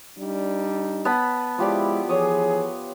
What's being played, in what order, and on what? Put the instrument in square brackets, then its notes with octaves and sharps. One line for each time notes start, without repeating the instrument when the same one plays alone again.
[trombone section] G3 D4 D#4
[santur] B3 A5 B5
[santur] F3 G4 D5 [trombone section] G#3 E4
[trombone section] E3 F3 G#4 [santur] C#5 D#6